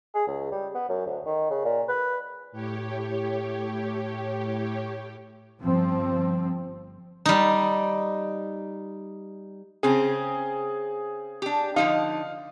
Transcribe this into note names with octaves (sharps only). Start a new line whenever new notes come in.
G#4
C#2
G3
B3
F#2
D2
D#3
C#3
A#2
B4
A2 G4 C#5
G1 F3 C4
G3 D#4
C#3 C4 C#4 G#4
D4 G4
D3 F3 D#4 F5